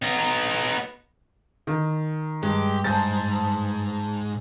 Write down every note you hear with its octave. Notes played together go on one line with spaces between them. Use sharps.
B3 D#4
D#3
G2 G#3 G4
G#2 C5 G#5 A5 G6 A6